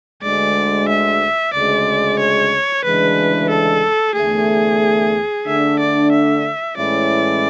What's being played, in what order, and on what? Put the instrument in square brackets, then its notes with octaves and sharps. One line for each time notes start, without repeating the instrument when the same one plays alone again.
[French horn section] D2 D3 G#3 [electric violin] D5
[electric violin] E5
[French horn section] D2 C#3 G#3 [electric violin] D5
[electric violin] C#5
[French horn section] D2 C#3 E3 G#3 D4 [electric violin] B4
[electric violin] A4
[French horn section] E2 D3 A3 [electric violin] G#4
[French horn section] D3 A3 D4 [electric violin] E5
[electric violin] D5
E5
[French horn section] A2 E3 G#3 C#4 E4 [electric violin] D5